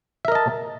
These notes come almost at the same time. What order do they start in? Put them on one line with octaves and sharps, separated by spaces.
E5 A#4 D#5 A5